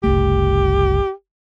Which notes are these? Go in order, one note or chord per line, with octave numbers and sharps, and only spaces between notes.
F#1 C2 A3 G4